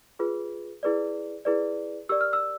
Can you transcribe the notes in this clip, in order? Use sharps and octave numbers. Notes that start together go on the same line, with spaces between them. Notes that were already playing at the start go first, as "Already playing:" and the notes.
F4 G#4 B4
E4 G#4 B4 D5
E4 G#4 B4 D5
G4 A#4 D5 E6
F6
E6